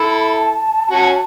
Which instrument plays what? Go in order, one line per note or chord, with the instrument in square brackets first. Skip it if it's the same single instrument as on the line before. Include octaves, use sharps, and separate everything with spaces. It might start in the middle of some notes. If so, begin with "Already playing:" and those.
Already playing: [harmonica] E4 A4 [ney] B5
[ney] A5
[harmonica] C#4 F#4